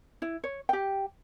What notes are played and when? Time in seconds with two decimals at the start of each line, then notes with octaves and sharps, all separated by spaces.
0.22 E4
0.44 C#5
0.69 G4 G5